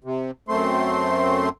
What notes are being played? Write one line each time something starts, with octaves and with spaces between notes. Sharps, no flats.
C3
F#2 A3 C4 C6